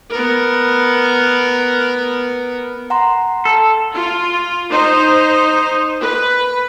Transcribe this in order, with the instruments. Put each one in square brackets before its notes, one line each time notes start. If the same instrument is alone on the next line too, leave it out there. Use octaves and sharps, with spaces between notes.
[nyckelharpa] B3 A#4
[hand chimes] F#5 A#5 C6
[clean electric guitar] A4
[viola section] F4
D#4 C5
B4